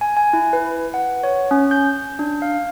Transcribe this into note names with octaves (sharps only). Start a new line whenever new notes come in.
G#5
G#5
E4
B4
F#5
C#5
C#4
G6
D4
F5